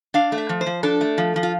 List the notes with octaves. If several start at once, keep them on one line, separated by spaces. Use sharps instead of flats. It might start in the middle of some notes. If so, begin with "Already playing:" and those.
D4 F5
A3
E5
F3
C5
F3
D4 A4
A3
F3
F3
F4